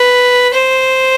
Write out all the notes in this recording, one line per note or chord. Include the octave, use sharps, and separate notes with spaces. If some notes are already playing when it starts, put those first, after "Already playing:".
Already playing: B4
C5